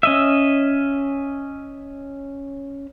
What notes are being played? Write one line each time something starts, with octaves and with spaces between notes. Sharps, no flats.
C#4 D#5 E5